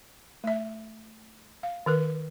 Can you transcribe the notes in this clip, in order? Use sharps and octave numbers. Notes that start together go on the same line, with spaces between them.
A3 E5
F5
D#3 A#4 B4